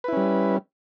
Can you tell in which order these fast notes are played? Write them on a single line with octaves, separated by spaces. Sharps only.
B4 E4 C#4 G3